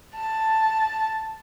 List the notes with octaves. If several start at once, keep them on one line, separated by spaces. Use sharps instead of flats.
A5